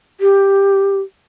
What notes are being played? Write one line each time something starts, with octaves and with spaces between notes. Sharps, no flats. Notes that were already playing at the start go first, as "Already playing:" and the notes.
G4